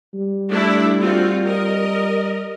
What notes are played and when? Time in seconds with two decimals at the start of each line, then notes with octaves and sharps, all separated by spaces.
0.14 G3
0.49 A3 D4 E4
1.00 C4 F4 F#4
1.45 A#4 D#5